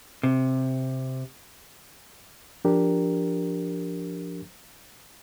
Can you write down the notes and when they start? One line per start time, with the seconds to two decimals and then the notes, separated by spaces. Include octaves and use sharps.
0.23 C3
2.65 F3 D4 G4 A#4